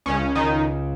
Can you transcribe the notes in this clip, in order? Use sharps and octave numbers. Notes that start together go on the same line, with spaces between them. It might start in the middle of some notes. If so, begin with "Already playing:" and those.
C#2 C#3 C#4
D#3 D#4